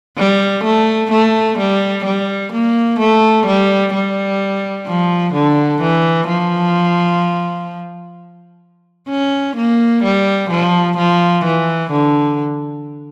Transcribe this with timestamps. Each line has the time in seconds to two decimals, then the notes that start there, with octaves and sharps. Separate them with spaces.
0.18 G3
0.64 A3
1.11 A3
1.58 G3
2.05 G3
2.53 A#3
2.99 A3
3.46 G3
3.94 G3
4.87 F3
5.33 D3
5.81 E3
6.28 F3
9.09 C#4
9.56 A#3
10.04 G3
10.50 F3
10.97 F3
11.45 E3
11.91 D3